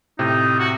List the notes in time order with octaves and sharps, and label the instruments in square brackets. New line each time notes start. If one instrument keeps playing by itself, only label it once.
[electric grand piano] A2 C3 [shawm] D#4
[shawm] F#4